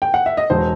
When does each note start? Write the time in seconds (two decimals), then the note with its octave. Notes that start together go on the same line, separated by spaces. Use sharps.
0.02 G5
0.14 F#5
0.26 E5
0.37 D#5
0.50 E1 C5